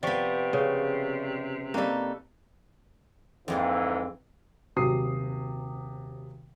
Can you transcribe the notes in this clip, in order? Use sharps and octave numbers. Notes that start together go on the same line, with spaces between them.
C3 F3 B3 D5 G5 C#6
C#3
G3 A#3 C4 D#4 A4
F2 G#2 D3 E3 A#3 C6
D#1 C3 F#3 D#6 C7